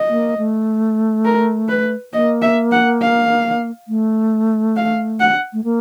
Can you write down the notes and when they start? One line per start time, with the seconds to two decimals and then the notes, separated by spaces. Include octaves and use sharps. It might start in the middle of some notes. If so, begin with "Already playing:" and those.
Already playing: D#5
0.09 A#3
0.37 A3
1.25 A#4
1.69 B4
2.13 A#3 D#5
2.42 E5
2.72 F#5
3.01 F5
3.88 A3
4.76 F5
5.20 F#5
5.53 A3
5.64 A#3